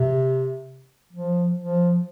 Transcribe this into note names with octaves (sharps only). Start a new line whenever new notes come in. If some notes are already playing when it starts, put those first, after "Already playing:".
Already playing: C3
F3
F3